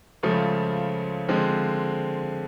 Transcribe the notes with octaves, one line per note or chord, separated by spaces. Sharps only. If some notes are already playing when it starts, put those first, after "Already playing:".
C#2 C#3 F3 A3
D3 F3 G#3 C4